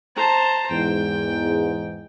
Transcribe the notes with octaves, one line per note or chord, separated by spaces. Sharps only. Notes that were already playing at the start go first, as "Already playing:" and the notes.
C5 A5 A#5
E2 G#2 G5